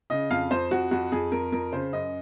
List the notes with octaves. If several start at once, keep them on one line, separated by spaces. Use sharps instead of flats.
C#3 D#5
F2 F5
F2 C5
F2 F#4
F2 F#4
F2 G#4
F2 A#4
F2 A#4
C#3 C5
F#2 D#5